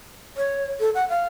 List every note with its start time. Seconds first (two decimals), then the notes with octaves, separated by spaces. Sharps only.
0.37 C#5
0.80 A4
0.95 F#5
1.09 F5